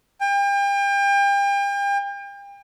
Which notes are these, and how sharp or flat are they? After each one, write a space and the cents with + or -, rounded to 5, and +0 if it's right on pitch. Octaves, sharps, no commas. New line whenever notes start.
G5 +35